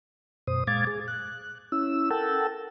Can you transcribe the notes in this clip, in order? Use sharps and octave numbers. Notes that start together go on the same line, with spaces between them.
F#2 B2 C5 D#6
A#2 G#3 F5 D6 G#6 A6
G#4
F#6
C#4 E4 E6
A4 A#4 F#5 G5 A5 E6